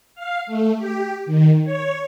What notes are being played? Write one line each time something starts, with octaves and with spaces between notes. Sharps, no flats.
F5
A3
G4
D#3
C#5